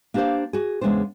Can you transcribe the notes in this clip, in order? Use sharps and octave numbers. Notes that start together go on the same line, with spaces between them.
A#3 D4 G4 A#4 C5 F5
F#4 G#4
E2 C#3 G#3 B3 D4 C5